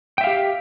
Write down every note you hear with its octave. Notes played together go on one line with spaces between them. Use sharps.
G4 E5 F5 G5